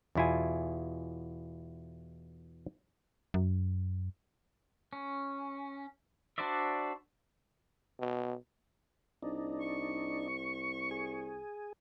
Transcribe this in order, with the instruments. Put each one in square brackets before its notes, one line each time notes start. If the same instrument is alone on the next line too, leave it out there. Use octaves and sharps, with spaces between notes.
[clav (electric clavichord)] E2 B2 E4 F4 G#5
[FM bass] F#2
[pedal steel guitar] C#4
D4 F#4 C5 D5 E5
[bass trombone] B2
[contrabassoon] C2 [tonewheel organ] D4 D#4
[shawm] C#6
[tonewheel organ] G#4